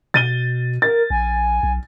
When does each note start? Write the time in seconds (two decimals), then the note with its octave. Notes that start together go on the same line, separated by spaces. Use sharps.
0.14 B2 A6 D#7 G7
0.82 A#4 A6
1.10 A#1 G#5
1.63 B1